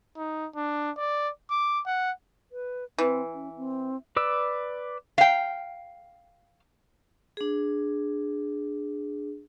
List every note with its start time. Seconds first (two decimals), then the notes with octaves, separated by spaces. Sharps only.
0.17 D#4
0.56 D4
0.97 D5
1.50 D6
1.86 F#5
2.52 B4
2.98 E3 C4
3.34 C#4
3.57 C4
4.16 B4 D5 E6
5.18 F5 G5
7.37 D4 G#4